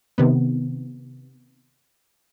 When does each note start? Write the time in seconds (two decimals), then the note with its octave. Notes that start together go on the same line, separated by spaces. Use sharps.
0.18 C3 D#3 B3